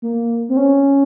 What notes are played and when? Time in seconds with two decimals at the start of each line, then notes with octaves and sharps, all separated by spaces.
0.02 A#3
0.49 C4
0.57 C#4